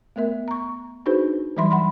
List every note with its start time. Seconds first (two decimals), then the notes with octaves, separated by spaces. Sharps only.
0.16 A3 B3 A#4 E5
0.48 A#5 C#6
1.06 D4 D#4 F#4 G#4 B4 C5
1.57 E3 F#3 G3 E5 B5 C6
1.71 F#5 B5 C6